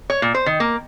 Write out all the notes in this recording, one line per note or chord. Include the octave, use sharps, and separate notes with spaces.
C#5
A#2
C5
D#3
A#3